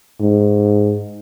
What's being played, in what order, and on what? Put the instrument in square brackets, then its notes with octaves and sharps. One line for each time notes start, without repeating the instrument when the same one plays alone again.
[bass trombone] G#2